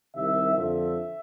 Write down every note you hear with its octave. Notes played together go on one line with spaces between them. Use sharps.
C2 C3 D#3 E5
F2 D3 F3 E5